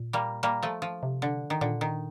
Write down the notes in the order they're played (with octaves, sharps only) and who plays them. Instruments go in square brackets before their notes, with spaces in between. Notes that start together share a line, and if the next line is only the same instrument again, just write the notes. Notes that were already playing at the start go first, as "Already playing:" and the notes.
Already playing: [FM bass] A#2
[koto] G3 A#3
G3 A#3
F3 A3
F3
[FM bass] C3
[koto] D3
D#3
[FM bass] A#2 [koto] D3
[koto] D#3